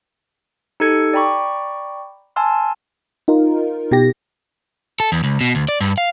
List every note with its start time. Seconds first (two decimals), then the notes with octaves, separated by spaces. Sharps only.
0.80 D#4 G4 A4 G#6 C#7
1.13 D5 G5 A#5 B5 C#6 D6
2.36 G#5 A5 C6 E6 F6
3.28 D#4 F4 A#4
3.92 B2 G4 A#6
5.00 A4
5.12 E2
5.24 C#2
5.41 B2
5.55 D2
5.69 D5
5.81 G2
5.98 F5